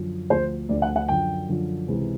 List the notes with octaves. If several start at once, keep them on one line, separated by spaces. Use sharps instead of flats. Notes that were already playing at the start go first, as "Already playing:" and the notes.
Already playing: F#2 D3 F3
D2 D3 F3 C5
D2 D3 F3 D5
F#5
F#5
F#2 D3 F3 G5
F#2 D3 F3
C#2 C3 E3